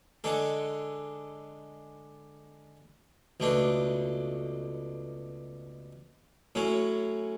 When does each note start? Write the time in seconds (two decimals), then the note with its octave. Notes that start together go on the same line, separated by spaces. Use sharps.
0.24 D3 G#3 D4 A4
3.40 C#2 B2 A3 D4
6.55 A2 F#3 C#4